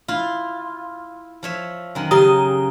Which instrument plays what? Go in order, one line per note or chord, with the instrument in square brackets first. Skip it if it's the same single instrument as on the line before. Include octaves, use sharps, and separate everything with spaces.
[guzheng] E4 F4
F3 C#5 E5
F#2 D#3
[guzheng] C#3 [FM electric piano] G4 A#5 D#6